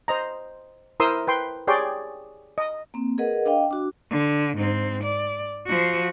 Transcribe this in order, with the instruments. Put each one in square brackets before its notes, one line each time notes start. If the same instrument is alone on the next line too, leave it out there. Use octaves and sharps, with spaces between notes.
[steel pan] C5 D#5 A#5
E4 A#4 C5 C6 D#6 E6
B4 G5 C6
G4 G#4 C#5 D5 G5 C6
D#5
[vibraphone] A#3 C4
G#4 A#4 B4 D#5 F#5
D4 D#5 F5 G5
D4 F#4
[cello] D3
G#2 C4
D5
F3 F#4